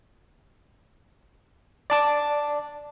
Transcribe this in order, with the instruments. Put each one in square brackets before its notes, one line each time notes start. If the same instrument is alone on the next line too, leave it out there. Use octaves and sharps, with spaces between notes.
[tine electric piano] D5 A5 D6